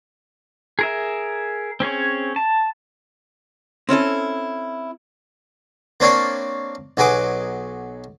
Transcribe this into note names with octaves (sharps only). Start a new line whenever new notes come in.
G#4 A#4 E5
C4 C#4 G#4 C#5
A5
C4 C#4 E4 A4
A#3 C4 D4 C#5 D5 F5
B1 F#3 G#4 B4 D6